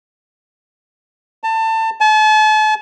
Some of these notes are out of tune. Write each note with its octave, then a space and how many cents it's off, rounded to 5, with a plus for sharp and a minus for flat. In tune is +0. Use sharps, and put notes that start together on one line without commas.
A5 +25
A5 -40